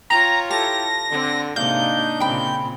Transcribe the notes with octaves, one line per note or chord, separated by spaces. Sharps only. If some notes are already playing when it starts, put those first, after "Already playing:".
F4 C#5 G5 A#5
E4 G4 A4 A5 A#6
D3 C4
G#2 C3 A#3 D4 D#4 F5 G6
A#2 C#3 C4 G5 B5